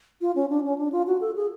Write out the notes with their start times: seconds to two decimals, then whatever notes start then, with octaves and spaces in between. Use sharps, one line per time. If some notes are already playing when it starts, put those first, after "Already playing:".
0.21 F4
0.35 C#4
0.50 D4
0.64 C#4
0.78 D4
0.92 F4
1.07 F#4
1.21 A4
1.36 G#4